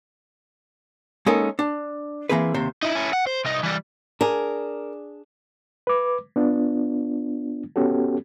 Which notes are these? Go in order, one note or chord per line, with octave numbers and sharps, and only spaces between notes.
G#3 A#3 C#4 D#4 A4 A#4
D4
E3 F#3 A#3 C4 G#4 B4
D#2 C3 C5
D#4 E4
C#4 E4
F#5
C5
C2 D#4
E3 G3
D4 G#4 A#4
B4 D6
B3 D4 F4
B3 C#4 F#4 G4 A4